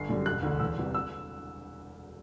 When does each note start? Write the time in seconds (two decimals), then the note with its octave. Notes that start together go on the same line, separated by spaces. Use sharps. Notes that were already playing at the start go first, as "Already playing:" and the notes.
Already playing: G1 C7
0.09 F#2 D3 G3
0.26 E1 F#6
0.43 D2 D3
0.60 E2 E6
0.78 C3 E3 G3
0.95 E6